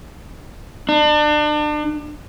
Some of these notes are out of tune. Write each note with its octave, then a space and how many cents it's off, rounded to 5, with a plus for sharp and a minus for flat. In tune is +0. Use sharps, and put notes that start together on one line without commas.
D4 +35